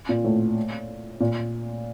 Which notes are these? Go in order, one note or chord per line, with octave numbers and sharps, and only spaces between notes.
A#2
A2
A#2